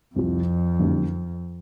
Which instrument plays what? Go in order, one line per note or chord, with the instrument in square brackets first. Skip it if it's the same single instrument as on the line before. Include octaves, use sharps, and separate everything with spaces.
[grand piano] C2 C3 F3 [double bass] F2
[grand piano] F#2 D3 G3 A#3 D#4